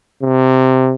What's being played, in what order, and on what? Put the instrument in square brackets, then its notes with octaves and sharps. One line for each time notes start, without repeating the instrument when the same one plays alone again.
[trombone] C3